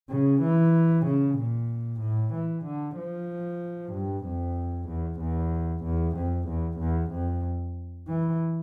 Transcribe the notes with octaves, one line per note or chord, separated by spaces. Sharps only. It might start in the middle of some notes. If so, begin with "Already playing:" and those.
C#3
E3
C#3
A#2
A2
E3
D3
F3
G2
F2
E2
E2
E2
F2
E2
E2
F2
E3